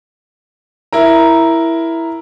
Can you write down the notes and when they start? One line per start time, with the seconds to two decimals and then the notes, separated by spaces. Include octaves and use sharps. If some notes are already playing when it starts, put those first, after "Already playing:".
0.93 E4 A#4 A#5